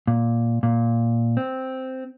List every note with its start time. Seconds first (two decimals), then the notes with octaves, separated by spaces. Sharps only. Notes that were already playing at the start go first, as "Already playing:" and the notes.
0.08 A#2
0.63 A#2
1.37 C4